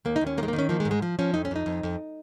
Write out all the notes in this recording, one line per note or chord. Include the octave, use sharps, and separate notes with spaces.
D#2 A#3
D#4
D#2
C#4
D#3 A#3
G#3
D#3 A#3
C#4
F3 A#3
G#3
G#2
G#3
F3
F3 C#4
F2 D#4
C#4
F2 D#4
F2
F2